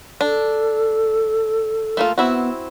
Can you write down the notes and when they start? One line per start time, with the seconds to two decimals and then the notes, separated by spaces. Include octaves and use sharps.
0.21 D4 A4
1.97 A3 A#3 F4
2.18 B3 C4 E4 F#4